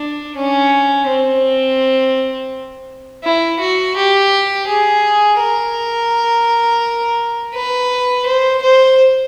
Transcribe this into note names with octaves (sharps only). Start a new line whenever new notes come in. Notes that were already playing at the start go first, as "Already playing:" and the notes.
Already playing: D4
C#4
C4
E4
F#4
G4
G#4
A#4
B4
C5
C5